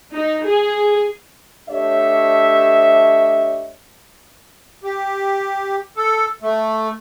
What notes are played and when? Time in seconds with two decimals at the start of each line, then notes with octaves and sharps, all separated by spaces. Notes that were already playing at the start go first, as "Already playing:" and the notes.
0.14 D#4
0.45 G#4
1.70 A3 D4 G4 C#5 D#5 E5
4.84 G4
5.97 A4
6.42 A3